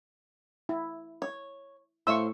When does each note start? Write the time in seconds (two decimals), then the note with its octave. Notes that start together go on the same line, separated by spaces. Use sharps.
0.69 E4
1.22 C#5
2.07 A2 C5 E5 F5 C#6 E6